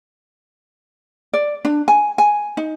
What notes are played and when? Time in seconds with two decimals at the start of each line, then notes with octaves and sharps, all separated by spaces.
1.33 D5
1.65 D4
1.88 G#5
2.18 G#5
2.57 D#4